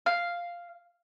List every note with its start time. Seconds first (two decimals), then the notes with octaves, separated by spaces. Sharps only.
0.06 F5